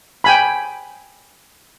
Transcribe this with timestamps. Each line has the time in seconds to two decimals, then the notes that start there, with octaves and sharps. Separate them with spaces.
0.24 G5 G#5 B5